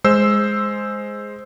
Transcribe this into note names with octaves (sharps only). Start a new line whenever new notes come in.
G#3 C5 E6